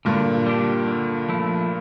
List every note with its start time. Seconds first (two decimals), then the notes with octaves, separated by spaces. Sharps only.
0.05 G2 A#2 D3
0.46 G3 D4 G4
0.87 D3
1.29 F3 A3 E4